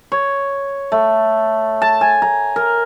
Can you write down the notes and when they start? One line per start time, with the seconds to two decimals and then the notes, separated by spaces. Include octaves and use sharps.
0.12 C#5
0.92 A3
1.82 A5
2.01 G#5
2.22 A#5
2.56 A#4